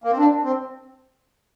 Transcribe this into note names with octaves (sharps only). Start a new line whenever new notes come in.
A#3
C4
D4
C4